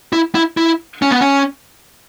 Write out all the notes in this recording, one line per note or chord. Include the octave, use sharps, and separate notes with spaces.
E4
E4
E4
C#4
B3
C#4